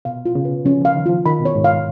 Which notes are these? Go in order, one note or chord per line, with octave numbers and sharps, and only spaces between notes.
B2 F5
F4
C#3
B4
F3 C#4
F3 F5
D#3
F3 F4
D#3 B5
B2
C#5
G#2
F5